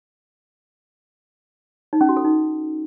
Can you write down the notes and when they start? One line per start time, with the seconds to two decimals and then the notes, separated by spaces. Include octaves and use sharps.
1.93 D#4
2.01 C#4
2.09 F#4
2.17 A4
2.25 D#4